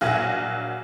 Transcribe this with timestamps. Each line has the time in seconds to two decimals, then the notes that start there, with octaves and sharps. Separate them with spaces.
0.01 A#1 F#3 F5 F#5 G#5 A#6